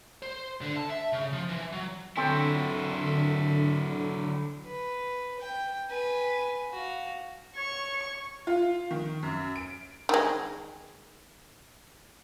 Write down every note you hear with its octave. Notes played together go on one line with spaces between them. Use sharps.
C5
D3
A5
E5
C#3
F3
E3
F#3
D3 F#3 C4 E4 A4 G5
B4
G5
B4 G#5
F#4 F5
C#5 C#6
F4
D#3
F#2
D7
D#3 G#3